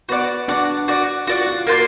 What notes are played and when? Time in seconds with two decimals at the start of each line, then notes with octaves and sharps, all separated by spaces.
0.09 B3 F#4 D5 F#5
0.48 D4 F#4 D5 F#5
0.88 F#4 D5 F#5
1.27 F4 F#4 D5 F#5
1.47 F4
1.66 A#3 F4 F#4 B4 D5